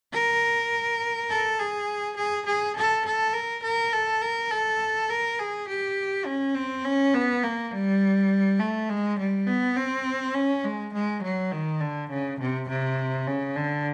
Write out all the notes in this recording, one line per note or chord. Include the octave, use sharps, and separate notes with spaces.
A#4
A4
G#4
G#4
G#4
A4
A4
A#4
A#4
A4
A#4
A4
A#4
G#4
G4
C#4
C4
C#4
B3
A#3
G3
A3
G#3
G3
B3
C4
C#4
G#3
G#3
F#3
D#3
D3
C#3
C3
C3
C#3
D3